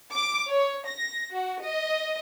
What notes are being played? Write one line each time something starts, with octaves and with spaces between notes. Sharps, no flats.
D6
C#5
A#6
F#4
D#5